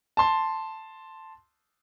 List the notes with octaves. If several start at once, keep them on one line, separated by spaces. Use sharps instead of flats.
A5 C6